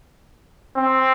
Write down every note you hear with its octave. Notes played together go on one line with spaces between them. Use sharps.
C4